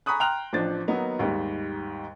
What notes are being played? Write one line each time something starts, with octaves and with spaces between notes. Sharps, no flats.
G#5 A#5 B5 C#6 D#6 F#6
G5 A#5 C6 F6 F#6 F7
A1 F3 D4 A6
D#3 F#3 A#3 B3 D#4
D#2 G#2 D#3 G3